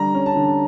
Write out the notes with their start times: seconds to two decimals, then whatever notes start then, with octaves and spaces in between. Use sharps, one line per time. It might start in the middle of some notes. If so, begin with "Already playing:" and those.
Already playing: D3 G3 A#5
0.15 C#4
0.26 A5
0.36 D3